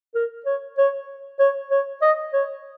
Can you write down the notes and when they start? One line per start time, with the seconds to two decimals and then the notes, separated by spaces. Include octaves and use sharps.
0.15 A#4
0.46 C#5
0.78 C#5
1.39 C#5
1.71 C#5
2.02 D#5
2.33 C#5